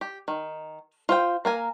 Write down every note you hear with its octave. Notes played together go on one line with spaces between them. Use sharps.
G4
D#3
F4 C5 G5
A#3 A#4 G#5